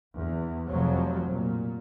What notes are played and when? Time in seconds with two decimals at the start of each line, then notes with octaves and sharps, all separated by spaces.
0.17 E2
0.68 F1 F3 F#3
1.29 A#2